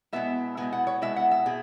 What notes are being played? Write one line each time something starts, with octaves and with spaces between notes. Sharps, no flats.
B2 G#3 B3 E4 E5
B2 G#3 B3 E4 G#5
F#5
C#5
B2 G#3 B3 E4 E5
F#5
E5
B2 G#4